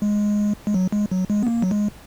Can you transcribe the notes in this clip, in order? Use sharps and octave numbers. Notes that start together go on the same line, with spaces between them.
G#3
G#3
F#3
G#3
F#3
G#3
B3
A#3
F#3
G#3